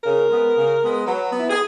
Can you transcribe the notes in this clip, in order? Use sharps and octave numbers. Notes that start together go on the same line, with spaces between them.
C#3 A#4
G#3 B3
C#3
G#3 B3
F#3 B4
B3 E4
G#4